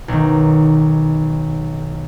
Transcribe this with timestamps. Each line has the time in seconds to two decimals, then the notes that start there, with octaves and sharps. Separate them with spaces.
0.08 B1 D#3